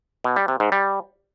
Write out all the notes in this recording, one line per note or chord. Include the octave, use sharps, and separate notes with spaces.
B2
G3
C3
G#2
G3